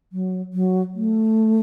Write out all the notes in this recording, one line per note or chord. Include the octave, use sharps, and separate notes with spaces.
F#3
F#3
A3